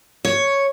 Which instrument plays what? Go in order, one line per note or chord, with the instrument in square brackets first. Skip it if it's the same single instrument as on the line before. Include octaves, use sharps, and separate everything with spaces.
[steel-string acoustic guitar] C#5